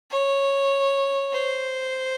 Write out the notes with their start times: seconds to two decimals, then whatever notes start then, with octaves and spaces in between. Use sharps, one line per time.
0.11 C#5
1.33 C5